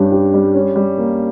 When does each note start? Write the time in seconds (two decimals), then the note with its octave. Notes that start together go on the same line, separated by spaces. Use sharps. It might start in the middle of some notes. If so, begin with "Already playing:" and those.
Already playing: G2 G3 C#4 G4
0.12 G4
0.34 G3
0.55 C#4
0.76 G3
0.98 A#3